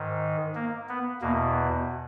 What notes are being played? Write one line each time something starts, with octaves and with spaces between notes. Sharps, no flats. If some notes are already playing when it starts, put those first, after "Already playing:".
Already playing: G#2 D#3
A#3
B3
E2 B2 A#3